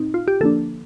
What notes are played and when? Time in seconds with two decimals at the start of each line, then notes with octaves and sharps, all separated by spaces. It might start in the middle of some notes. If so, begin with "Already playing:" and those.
Already playing: A#2 C4 D#4
0.14 F4
0.28 G4
0.40 D3 F3 A#3 D4 A4